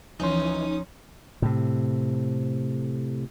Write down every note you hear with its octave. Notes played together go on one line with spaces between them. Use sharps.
D2 E3 F3 C#4 D#4 C6
A2 C3